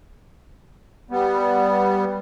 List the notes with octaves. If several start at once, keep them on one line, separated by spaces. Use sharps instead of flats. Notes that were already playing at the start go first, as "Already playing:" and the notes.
G3 B3